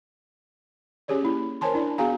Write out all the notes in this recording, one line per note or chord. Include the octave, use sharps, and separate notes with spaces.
C#4 G4 G#4 C#5 D5
A#3 E4
A#4 C5 C#5 G#5 A5 C6
D4 E4 D5
B3 F#4 G#4 F5 G#5 A#5